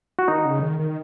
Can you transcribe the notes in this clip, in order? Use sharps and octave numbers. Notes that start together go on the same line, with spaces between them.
F#4
D#3 D#4
C#3
D#3
D#3